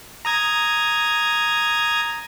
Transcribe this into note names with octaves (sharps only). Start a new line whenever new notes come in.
A#5 D#6 G#6